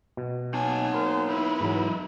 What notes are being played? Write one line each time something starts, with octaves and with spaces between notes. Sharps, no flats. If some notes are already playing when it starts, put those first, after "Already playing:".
B2
F#3 A#3 B3 D#4 G#5 A5
A#4 C5
D#4 E4 B4
G#2 E3 F#3